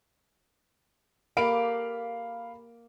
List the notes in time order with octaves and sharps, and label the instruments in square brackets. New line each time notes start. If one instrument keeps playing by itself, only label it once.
[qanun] A#3 G4 A4 [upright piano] F5 B5 D7